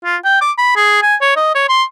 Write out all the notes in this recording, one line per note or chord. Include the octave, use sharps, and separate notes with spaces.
F4
G5
D6
B5
G#4
G#5
C#5
D#5
C#5
C6